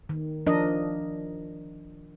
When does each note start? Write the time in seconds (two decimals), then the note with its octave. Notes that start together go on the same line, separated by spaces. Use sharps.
0.09 D#3
0.46 F3 D4 A#4 D#5